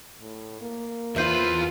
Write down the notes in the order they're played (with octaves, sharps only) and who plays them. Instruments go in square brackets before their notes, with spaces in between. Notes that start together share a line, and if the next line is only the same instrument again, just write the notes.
[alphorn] A2
A#3
[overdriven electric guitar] E2 B4 [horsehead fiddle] F4 [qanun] C5 E5